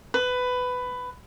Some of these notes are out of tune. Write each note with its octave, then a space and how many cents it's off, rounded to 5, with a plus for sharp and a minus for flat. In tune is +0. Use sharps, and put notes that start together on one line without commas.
B4 +15